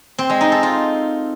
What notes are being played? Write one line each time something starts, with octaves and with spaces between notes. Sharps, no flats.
C4
G#3
D#4
A4
F4